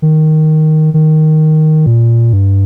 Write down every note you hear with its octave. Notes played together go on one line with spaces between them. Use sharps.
D#3
D#3
A#2
G2